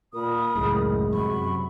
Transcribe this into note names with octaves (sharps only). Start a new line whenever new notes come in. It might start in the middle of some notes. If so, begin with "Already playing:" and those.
A#2 A#4 B5 D#6
C#2 F#2 A2 G#3
F#2 C3 F#3 B5 C#6